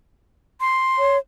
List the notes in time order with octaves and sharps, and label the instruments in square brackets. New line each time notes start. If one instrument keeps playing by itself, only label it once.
[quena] C6
[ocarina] C#5